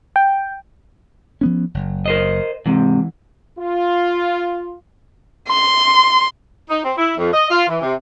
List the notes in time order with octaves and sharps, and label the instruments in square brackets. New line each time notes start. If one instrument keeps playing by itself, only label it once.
[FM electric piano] G5
[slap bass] F3 B3 C#4
F#1
[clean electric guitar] A#4 C5 D#5
[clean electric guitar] G#2 C3 [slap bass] E3
[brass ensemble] F4
[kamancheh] C6
[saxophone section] D#4
C4
E4
F2
D#5
F4
E3
C3